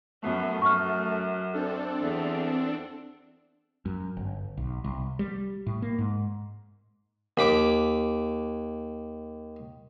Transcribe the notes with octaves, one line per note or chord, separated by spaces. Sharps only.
F#2 A3 B3
F#2 C#6 F6
C4 D4 A4
E2
F#2
G1
B1
C2
G3
A2
A#3
G#2
D#2 B5 D6